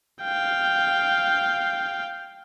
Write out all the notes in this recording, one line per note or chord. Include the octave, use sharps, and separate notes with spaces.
F5 G5